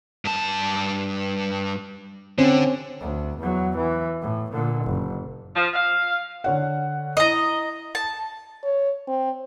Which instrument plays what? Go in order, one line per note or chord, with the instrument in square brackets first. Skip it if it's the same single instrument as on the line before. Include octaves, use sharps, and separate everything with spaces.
[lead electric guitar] G2 A5
[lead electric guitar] D3 [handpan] C4 C#4
[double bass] D2
E2 F#3
E3
A2
A#2 D3
F#1
[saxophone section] F3
F5
[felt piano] D3 C#5 F#5
[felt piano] E4 D#6 [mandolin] D#5 A#5
[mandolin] A5
[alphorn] C#5
C4